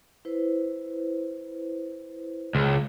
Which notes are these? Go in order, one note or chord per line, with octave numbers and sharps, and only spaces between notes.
E4 B4 C5
C#2